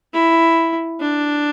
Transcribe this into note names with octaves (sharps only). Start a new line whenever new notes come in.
E4
D4